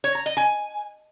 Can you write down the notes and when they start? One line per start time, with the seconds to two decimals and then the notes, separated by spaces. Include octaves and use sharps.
0.04 C#5
0.15 A#5
0.26 D#5
0.37 G#5